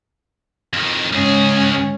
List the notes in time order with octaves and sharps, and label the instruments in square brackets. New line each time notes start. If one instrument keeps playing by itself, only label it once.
[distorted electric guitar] F2 D#3
[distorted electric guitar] C#2 G#4 [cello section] G#2 C#4